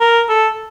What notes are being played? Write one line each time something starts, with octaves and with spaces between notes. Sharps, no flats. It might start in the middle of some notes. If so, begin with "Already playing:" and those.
A#4
A4